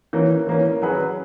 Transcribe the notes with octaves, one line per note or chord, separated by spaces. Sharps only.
E3 A#3 C#4
E3 A#3 C#4
F#3 C#4 G#4 B4